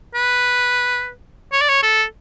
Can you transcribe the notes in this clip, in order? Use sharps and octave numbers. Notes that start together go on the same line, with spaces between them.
B4
C#5
D5
C#5
A4